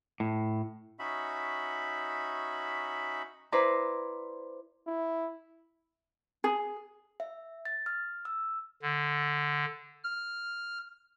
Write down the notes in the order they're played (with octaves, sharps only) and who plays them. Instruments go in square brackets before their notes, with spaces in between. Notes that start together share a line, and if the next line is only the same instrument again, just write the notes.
[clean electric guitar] A2
[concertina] C#4 D#4 F#4 E5 B5
[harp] E4 B4 C5 D5 A#5
[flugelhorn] E4
[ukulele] G#4
[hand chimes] E5
A6
F6
E6
[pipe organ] D3
F6